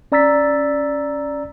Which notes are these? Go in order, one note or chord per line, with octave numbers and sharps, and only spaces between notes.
C#4 D5 A#5 E6 A6 B6